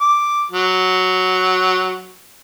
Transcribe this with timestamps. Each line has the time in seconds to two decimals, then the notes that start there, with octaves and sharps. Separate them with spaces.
0.01 D6
0.52 F#3